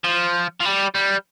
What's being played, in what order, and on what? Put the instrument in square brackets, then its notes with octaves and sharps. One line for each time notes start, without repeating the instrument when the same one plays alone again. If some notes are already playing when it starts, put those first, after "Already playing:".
[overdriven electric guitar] F3
F3
G3
G3